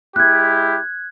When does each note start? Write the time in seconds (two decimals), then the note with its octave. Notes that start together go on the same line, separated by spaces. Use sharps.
0.16 G#3 E4 G4 F#6 G#6